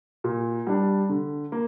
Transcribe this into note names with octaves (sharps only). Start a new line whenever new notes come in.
A#2
G3 D4
D3
A#3